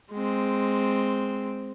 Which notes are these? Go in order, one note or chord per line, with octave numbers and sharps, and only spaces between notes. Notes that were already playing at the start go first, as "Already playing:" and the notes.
G#3 C4